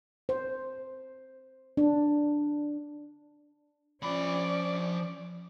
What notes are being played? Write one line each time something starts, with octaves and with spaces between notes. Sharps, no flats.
C5
D4
F3 C#4 D5 B5